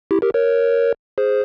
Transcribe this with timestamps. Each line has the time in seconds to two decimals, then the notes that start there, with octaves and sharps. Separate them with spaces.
0.11 E4 G4
0.22 G4 A#4
0.34 A#4 C#5
1.18 G#4 C5